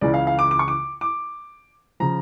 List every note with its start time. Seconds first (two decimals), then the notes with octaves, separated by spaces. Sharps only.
0.01 C#2 C#3 E3 D5
0.14 F5
0.27 F5
0.39 D6
0.51 D6
0.59 C#6
0.68 D6
1.01 D6
2.00 C#3 F3 A#5